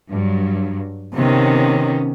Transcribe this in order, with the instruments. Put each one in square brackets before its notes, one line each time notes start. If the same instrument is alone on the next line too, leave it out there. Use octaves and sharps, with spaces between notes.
[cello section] G2 F#3
[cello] C3 D#3 [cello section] B3 C#4